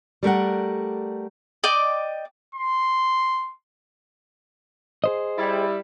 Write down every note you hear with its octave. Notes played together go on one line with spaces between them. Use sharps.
G3 A3 A#4 F#5
D5 D#5 G5 D6
C6
G#4 C5 D#5
G3 E4